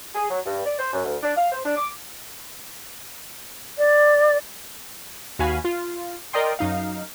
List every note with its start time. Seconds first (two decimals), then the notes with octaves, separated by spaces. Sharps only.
0.15 G#4
0.30 F#3
0.45 G2
0.65 D5
0.79 C5
0.93 F#2
1.05 D2
1.22 D4
1.36 F5
1.52 C5
1.65 D4
1.77 D6
3.77 D5
5.39 D#2 F#4 F5 G#5 B5
5.64 F4
6.33 A#4 D5 D#5 G5 C6
6.59 F#2 D#4 F5